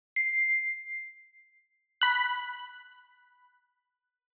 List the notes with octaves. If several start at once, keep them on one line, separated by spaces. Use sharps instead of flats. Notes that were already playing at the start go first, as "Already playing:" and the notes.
C7
B5 F#6